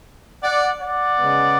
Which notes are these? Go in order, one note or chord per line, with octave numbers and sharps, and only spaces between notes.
D5 F#5
D5 F#5
C#3 G#3 B3